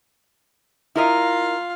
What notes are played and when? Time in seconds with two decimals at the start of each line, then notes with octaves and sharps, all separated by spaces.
0.96 E4 F4 A#4 D#5 F5